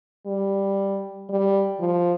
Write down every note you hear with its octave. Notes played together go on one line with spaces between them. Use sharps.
G3
G3
F3